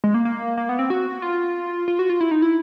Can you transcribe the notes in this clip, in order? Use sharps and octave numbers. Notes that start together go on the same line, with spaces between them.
G#3
A#3
A#3
A#3
B3
C4
F#4
F4
F4
F#4
F4
E4
D#4
E4